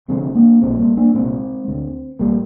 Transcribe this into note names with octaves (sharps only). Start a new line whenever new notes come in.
F1 F2 D3 G#3 C4
A#3 D4
A#1 A#2 G#3 C4
G3 A#3
A#3 D4
C2 A#2 G#3 C4
D2 D3
A#1 G3 A#3